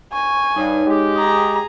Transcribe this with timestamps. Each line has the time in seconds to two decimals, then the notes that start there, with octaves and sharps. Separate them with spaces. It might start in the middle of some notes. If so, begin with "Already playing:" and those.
0.13 G#5 C#6
0.56 G2 D#4 C#5
0.86 G#3 G4
1.16 G#4 A#5 D#6